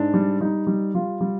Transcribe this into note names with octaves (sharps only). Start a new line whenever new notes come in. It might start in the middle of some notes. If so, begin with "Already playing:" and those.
Already playing: G#2 D4
G3
G3 D#4
G3
G3 F4
G3